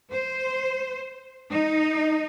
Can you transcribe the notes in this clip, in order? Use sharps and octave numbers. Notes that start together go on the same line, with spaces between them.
C5
D#4